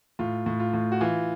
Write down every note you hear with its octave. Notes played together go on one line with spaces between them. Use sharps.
A2 F4
A2
F4
A2
F#4
E3 F4